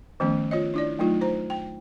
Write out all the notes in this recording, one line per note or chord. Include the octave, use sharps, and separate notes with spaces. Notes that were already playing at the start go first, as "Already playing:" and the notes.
D#3 F3 A3 B3 C#4
F4 C#5 D#5
D4 E4 D5
F#3 A3 D#4 F4
C5 A#5
G5